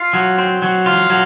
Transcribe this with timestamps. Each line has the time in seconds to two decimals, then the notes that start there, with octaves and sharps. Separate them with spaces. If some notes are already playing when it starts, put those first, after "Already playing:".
Already playing: F4
0.13 F#3
0.38 C4
0.62 F#3
0.86 F4
1.10 F#3